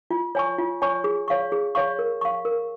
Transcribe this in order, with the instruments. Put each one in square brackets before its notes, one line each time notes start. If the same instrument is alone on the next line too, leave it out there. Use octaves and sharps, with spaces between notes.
[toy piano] F4
C#5 G#5 C#6
F4
C#5 G#5 C#6
G#4
C#5 F5 C#6
G#4
C#5 F5 C#6
A#4
F5 C#6
A#4